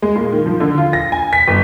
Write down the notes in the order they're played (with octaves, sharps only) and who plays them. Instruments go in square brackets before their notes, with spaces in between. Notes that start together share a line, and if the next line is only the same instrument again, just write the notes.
[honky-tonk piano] G#3
A#2
D#3
F3
D3
F4
A#6
G#5
B6
G1